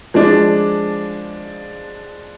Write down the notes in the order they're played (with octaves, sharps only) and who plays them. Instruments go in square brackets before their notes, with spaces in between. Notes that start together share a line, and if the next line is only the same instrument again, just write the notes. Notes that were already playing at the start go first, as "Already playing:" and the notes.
[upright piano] F3 G#3 D4